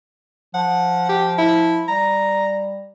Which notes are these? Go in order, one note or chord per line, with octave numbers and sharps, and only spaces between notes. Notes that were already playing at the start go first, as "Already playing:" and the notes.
F3 F#5
G4
E4
G3 A#5